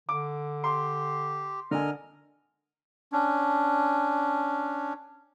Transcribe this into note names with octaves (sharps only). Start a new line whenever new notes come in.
D3 D6
G4 C6
D3 A#4 D#5 G#5 F6
C#4 D4